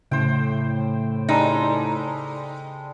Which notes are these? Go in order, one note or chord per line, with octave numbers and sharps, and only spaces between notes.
A2 C#3 C5 G5
G3 G#3 D#4 A4